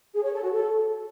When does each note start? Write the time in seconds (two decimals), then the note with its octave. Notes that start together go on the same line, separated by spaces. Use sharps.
0.15 G#4
0.24 C#5
0.33 A4
0.42 F#4
0.52 A4